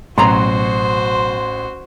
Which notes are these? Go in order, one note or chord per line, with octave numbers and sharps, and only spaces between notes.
A1 B2 F#3 F#4 C5 A#5 C6